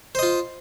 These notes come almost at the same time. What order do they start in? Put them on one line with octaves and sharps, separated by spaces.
C5 D#5 F4